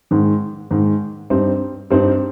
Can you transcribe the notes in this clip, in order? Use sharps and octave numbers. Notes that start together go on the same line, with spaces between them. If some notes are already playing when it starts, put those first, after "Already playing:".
G#2 D#3 G#3
G#2 D#3 G#3
G2 G3 C4 D#4
G2 G3 C4 D#4